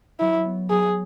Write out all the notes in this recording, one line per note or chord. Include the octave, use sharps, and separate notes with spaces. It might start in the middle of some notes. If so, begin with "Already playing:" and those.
F#3 E4
B3
F#3 G#4